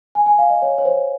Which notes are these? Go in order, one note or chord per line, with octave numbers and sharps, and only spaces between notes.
G#5
G#5
F5
D#5
C#5
C#5
C5